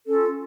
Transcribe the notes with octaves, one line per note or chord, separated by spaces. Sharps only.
C#4 F4 A4